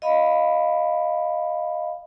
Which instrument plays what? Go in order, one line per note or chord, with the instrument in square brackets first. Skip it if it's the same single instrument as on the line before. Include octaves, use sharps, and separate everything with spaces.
[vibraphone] D#5 F5 B5